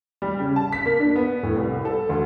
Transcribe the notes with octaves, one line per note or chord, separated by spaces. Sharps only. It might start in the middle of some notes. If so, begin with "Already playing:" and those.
G3
C#3
A5
B6
A#3
D4
B3
A2
C2
A4
D2